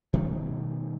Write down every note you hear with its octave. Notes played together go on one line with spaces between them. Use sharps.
B2 D#3 G3 A3